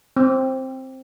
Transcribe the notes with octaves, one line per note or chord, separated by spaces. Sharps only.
C4